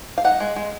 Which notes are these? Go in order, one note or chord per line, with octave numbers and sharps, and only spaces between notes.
F5
D#4 F#5
G#3
G#3